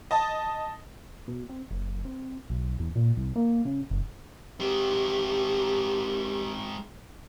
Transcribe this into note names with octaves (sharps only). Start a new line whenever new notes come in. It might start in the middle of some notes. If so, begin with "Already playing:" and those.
D#5 A5
B2
C4
F#1
C4
B1
E2
A#2
C2
A#3
C#3
F#1
G#3 C4 G4